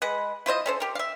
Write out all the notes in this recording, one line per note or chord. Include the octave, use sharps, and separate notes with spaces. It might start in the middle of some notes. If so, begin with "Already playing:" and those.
G#3 B4 F#5
E4 F4 C5 D#5
C#4 A4 C5
G4 A#4
E5 F5